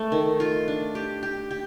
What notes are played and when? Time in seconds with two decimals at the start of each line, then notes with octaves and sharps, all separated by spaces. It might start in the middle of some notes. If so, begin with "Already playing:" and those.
Already playing: A3
0.12 D#3
0.40 F4
0.68 D4
0.95 G4
1.23 G4
1.51 G4